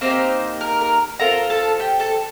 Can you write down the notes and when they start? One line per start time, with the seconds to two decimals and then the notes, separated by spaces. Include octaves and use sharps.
0.01 A#3 C4 D#4 G4 C5
0.61 A#4
0.81 A#4
1.20 C4 F4 A4 A#4 A#5
1.50 A4 A5
1.80 G4 G5
2.00 A4 A5